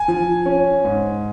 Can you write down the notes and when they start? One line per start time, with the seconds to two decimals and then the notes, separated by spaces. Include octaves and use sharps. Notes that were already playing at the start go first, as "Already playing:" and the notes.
Already playing: G#5
0.08 F3
0.46 C#4
0.85 G#2